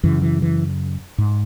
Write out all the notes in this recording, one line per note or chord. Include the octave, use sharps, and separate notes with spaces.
F#2 C#3 E3
E3
E3
G#2